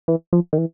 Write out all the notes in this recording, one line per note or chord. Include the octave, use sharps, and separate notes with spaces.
E3
F3
D#3
E3